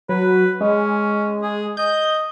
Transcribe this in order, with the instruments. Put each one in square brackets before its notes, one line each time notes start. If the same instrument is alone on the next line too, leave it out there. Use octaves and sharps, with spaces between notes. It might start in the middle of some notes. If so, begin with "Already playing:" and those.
[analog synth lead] F#3 [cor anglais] B4
[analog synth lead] G#3 [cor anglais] C#4
[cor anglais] G#4
[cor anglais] D#5 [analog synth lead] G6